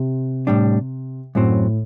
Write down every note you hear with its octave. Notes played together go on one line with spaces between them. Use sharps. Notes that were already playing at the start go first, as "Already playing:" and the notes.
Already playing: C3
A2 G3 D4
F#2 A2 F#3 C4